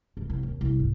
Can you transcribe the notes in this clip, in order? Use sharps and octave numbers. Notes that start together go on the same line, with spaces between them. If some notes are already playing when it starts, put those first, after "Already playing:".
C#2
C2
D#2
C2
G#2